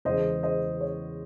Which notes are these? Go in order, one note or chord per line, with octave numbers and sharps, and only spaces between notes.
E2 C#3 G#3 C5 D#5
C5 D#5
C#5